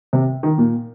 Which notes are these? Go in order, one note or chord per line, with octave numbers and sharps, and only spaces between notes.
C3
D#3
A#2